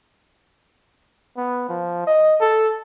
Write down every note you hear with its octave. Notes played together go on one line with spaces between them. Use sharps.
B3
F3
D#5
A4